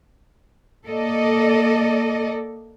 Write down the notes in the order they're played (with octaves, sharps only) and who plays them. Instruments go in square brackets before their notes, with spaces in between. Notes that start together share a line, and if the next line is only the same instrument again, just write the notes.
[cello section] A#3 A4 D5 D#5